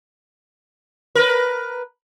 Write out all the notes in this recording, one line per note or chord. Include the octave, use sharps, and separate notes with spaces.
A#4 B4